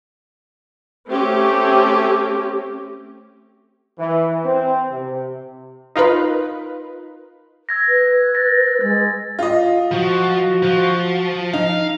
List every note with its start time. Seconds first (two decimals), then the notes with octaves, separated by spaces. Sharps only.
1.08 A3 C4 C#4 G4
3.98 E3
4.45 C4
4.90 C3
5.96 D#4 F4 A#4 B4
7.69 E6 G#6 A#6
7.88 B4
8.35 A6 A#6
8.81 G#3 A6
9.39 F4 D#5
9.92 F3 F#4
10.62 F3
11.53 D#4 F5